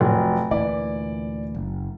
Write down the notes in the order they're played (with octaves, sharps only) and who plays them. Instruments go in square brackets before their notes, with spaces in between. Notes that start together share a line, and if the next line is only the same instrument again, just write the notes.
[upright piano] F1 [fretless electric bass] F#3
[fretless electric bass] D2 A#2 E3 [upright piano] D5
[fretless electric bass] F#1